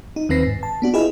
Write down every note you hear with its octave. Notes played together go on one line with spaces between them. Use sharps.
D#4
D#2 D#3 C4 B4 A#6 C7
G#2
A5
B3 D4 F#4
E4 F4 G#4 B4 D#5